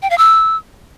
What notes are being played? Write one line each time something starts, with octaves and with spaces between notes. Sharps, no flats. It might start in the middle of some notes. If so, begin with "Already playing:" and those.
G5
F5
E6